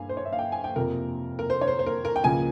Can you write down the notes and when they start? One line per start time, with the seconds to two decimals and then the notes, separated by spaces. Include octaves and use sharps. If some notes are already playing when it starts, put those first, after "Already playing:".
Already playing: G2 A#3 F5 G#5
0.09 C5
0.17 C#5
0.25 E5
0.33 F5
0.39 G5
0.52 G#5
0.64 G5
0.76 F2 C3 F3 A#3 A#4
1.39 A#4
1.50 C5
1.61 C#5
1.68 C5
1.79 C5
1.86 A#4
2.05 A#4
2.16 G5
2.23 C#2 C#3 F3 A#3 G#5